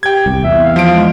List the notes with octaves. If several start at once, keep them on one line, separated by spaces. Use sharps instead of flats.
G4 G5 G#6
C2
E2 E5
F5
F3 D7
G#3